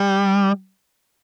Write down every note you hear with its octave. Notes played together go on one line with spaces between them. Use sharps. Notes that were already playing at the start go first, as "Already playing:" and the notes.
Already playing: G3